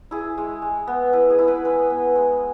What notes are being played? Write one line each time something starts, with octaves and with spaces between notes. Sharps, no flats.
E4 G#4
G#3
G#3
B3
E4 B4
G#4
E4
B4
G#3 B4
B3
G#3